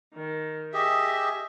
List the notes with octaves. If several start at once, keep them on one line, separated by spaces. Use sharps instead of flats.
D#3
G4 G#4 D#5 E5